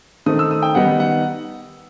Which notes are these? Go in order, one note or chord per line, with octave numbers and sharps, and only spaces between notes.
D#3 A3 C4 D#4 D#6
E6
D#6
G5
D#3 G3 B3 D#4 F#5
F#5